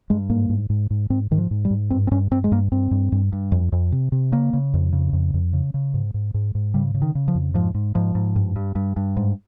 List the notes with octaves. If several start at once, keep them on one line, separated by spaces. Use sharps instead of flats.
G2 G#3
G#2 A#3
G#2
G#2
G#2
G#2 C4
G#2 D#3
F3
G#2
G3
G#2
G2 C4
C4
G2 C#4
G2 C4
G#3
G2 A#3
G2 C4
G2
G2
G2
F2
F2
C3
C3
C#3 A#3
C#3
F2
C#3
F2
F2
C#3
C#3
G#2
G#2
G#2
G#2
C#3 G3
C#3
D#3
C#3
F3
F2
G#2 F3
G#2
G#2 F3
G#2
G2
G2
G2
G2
G#2